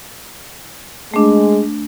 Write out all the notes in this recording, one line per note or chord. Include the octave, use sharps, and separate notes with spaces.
G#3 A3 D4